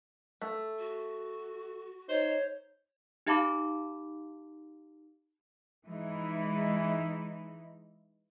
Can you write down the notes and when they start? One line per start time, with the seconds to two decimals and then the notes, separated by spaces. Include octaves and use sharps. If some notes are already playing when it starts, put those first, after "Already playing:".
0.42 A3
0.78 F#4
2.09 D#4 C5 C#5
3.27 D#4 G4 F5 A5 B5 D6
5.86 E3 G#3 D#4 E4